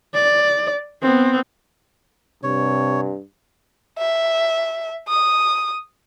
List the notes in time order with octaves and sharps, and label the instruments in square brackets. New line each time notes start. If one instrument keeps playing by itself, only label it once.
[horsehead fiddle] D5
B3 C4
[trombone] G2 [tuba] C3 [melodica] C#5
[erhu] E5
D#6